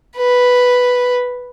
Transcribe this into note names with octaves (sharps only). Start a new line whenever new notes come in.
B4